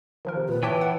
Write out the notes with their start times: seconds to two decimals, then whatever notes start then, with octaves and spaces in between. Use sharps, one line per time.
0.25 D#3 F3 A#4
0.37 C3
0.49 A#2 B4
0.63 E3 C#5 E5 G5 A5 D6
0.81 F#5